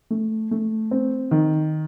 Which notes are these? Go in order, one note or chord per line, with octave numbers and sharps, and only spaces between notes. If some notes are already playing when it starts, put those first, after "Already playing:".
A3
A3
C4
D#3